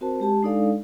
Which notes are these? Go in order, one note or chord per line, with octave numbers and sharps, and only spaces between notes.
C4 F#4 A#4 C5 A5
G#3 G4 A5
G#3 D4 D#4 A4 D5 F5